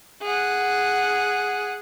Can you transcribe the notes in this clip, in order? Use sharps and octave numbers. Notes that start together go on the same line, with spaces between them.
G#4 F#5